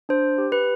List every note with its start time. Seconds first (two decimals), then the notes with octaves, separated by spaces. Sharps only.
0.09 D4 C5
0.38 G4
0.52 B4